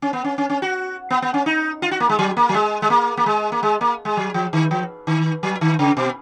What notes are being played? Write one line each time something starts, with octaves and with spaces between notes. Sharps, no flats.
C#4
B3
C#4
C#4
C#4
F#4
B3
B3
C#4
D#4
F4
F#4
A#3
G#3
F#3
A#3
F#3
G#3
G#3
A#3
A#3
G#3
A#3
G#3
A#3
G#3
F#3
F3
D#3
F3
D#3
F#3
D#3
C#3
B2